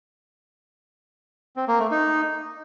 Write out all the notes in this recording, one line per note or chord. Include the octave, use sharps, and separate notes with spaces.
C4
A#3
A3
D#4